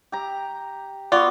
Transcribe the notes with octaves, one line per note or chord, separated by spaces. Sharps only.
G4 A#5
B3 F4 F#4 D5 D6